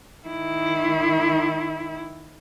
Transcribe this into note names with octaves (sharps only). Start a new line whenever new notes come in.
D#3 E4